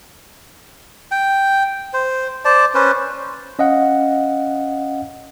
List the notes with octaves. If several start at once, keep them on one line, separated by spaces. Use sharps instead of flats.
G5
C5
C5 D5 A5
C#4 B4 C5
C#4 D#5 F5 F#5